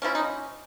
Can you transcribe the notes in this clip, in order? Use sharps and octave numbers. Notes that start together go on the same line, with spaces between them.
F3 A#3 C#4 E4
D#4